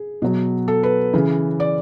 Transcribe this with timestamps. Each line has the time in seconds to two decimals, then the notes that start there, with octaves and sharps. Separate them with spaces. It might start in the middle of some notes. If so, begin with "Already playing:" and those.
Already playing: G#4
0.22 B2 F#3
0.68 A4
0.83 B4
1.14 C#3 E3
1.60 D5